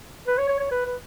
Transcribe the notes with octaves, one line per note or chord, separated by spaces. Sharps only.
B4
C#5
C#5
C#5
B4
B4